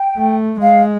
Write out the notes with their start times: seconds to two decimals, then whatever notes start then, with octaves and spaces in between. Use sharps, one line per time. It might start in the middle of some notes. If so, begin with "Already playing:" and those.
Already playing: G5
0.18 A3
0.61 G#3 F5